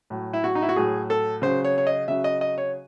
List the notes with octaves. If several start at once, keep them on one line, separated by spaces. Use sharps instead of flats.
A2 F#3
E4
F#4
D#4
E4
F#4
A2 F#3 G#4
A4
C#3 F#3 C5
C#5
C#5
D#5
C#3 F#3 E5
D#5
D#5
C#5